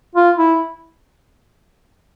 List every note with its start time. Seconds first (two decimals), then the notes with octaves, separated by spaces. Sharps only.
0.15 F4
0.38 E4